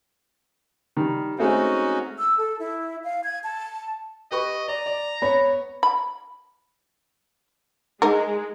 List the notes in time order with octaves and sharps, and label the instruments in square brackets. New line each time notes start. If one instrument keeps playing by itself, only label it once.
[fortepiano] D#3 G3
[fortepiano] G#3 A3 C4 [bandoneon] C#4 D#4 F#4
[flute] E6
A4
E4
F5
G#6
A5
[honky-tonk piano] G4 B4 C#6 [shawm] D#5
[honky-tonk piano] D5 [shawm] A#5
[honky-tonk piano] D5
[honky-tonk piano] B3 [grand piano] C#5 B5
[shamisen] B5
[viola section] G#3 [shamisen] D#4 A#4